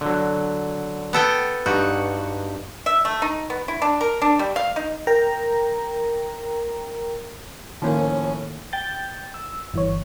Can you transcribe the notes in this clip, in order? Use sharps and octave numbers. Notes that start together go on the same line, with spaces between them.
D3 F#3
B3 A4 G5
G2 D#4 F#4 G4
E5
A3
D#4
B3
E4
D4
A#4
D4
G3
F5
D#4
A#4 G5 A#5
A2 D#3 F3 A#3 C#4
G5 G6 A6
E6
G1 E3 C#5